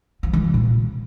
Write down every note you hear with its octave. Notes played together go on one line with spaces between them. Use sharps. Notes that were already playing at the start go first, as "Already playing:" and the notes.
F3
D#3
C#3
A#2